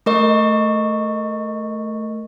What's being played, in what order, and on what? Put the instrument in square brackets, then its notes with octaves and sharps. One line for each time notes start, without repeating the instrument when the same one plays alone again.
[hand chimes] A3 A#4 D#5 C#6